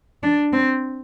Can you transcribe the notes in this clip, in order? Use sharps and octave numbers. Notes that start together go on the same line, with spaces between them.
D4
C4